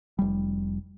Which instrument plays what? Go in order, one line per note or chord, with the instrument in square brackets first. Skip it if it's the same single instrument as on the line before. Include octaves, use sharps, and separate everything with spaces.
[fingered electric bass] F1 G3